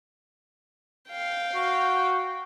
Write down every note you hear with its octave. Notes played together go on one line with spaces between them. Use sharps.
F5 G5
F#4